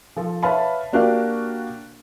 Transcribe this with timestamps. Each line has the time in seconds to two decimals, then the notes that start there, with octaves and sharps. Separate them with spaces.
0.17 F3 A4
0.43 B4 C#5 E5 F5 A5 B5
0.93 A#3 D4 F#4 G4 A#4 F5